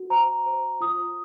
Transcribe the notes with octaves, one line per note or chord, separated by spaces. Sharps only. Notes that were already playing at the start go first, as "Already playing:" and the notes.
Already playing: F#4
C5 A#5
C5
F4 D#6